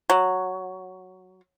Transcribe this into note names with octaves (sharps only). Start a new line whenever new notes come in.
F#3